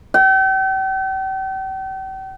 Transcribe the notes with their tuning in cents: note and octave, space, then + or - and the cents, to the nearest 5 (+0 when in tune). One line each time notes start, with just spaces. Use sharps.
G5 -40